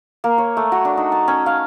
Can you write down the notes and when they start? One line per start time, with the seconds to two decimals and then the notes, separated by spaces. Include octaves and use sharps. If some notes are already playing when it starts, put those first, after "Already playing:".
0.24 A#3
0.38 C#5
0.57 A3
0.72 F#4
0.85 D4
0.97 D#4
1.12 A5
1.28 C#4
1.46 F5